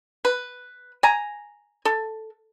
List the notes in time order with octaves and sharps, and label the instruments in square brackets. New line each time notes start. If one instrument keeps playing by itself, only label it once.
[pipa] B4
G#5 A#5
A4